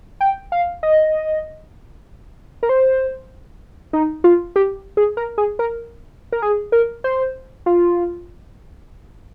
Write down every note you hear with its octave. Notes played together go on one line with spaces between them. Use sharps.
G5
F5
D#5
A#4
C5
D#4
F4
G4
G#4
A#4
G#4
A#4
A#4
G#4
A#4
C5
F4